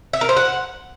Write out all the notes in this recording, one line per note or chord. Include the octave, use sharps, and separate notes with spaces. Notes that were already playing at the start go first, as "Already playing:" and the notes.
E5
A#4
C5
F#5